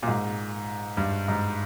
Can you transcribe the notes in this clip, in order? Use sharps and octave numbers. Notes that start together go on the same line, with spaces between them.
A#2
G#2
G2
G#2